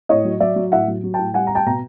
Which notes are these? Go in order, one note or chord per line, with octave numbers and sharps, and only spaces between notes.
A2 C#5 D#5
F#3
F#3 D5 E5
F#3
A2 E5 F#5
F#3
F#3
A2 G5 A5
G3 F#5 G#5
A#5
G3 G5 A5
B2 A#5